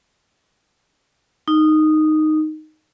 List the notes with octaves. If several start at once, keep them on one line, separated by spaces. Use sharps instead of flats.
D#4